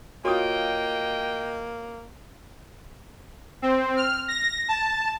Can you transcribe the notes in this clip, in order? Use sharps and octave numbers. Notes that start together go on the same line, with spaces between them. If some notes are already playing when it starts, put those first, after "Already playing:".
A#3 F4 F#4 C#5 D#5 G5 D#6
C4
F6
A#6
A5